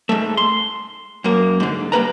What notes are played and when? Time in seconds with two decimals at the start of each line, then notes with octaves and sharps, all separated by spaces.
0.09 G#2 A3
0.37 C6
1.24 F#2 A#3
1.60 G#2 D3
1.92 G2 A#3 B4 A#5